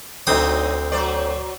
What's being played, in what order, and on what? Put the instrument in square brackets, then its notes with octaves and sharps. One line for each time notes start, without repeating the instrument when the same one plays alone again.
[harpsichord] D2 C4 D#6 [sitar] F#3 D#4
[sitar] F#3 C5 D5